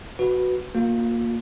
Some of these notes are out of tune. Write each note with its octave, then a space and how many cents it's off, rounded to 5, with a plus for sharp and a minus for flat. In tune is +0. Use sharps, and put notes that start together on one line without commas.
F#4 +0 B4 +0
A#3 +0 F4 +35